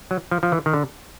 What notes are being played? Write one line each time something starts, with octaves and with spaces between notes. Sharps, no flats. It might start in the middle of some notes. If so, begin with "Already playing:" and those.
F#3
F3
F3
E3
D#3
D3